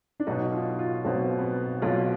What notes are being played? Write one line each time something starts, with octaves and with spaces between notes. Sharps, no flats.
D4
B1 B2 D#4
F4
F4
B1 B2 C4
B3
B3
B1 B2 F4